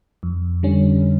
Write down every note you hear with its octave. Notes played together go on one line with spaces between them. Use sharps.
F2
D3 G3 C#4